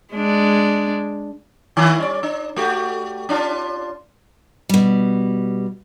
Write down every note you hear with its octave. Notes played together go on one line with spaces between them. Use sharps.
G#3 D4
D#3 A#3 E4
G3 C#4 D5
D4
A3 F#4 G4
C#4 D4 F4
B2 G3